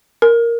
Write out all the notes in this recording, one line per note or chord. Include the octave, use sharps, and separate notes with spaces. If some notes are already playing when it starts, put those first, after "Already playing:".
A#4